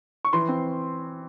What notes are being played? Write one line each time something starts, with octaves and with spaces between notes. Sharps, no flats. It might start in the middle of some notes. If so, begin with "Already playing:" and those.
C#6
E3 C6
C4